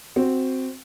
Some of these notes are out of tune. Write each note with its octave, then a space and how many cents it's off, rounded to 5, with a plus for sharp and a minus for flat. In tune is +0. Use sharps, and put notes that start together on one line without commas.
C4 +0 F#4 +0